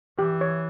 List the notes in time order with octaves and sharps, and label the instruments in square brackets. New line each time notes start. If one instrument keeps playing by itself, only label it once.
[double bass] E3 [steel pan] G4
[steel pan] C#5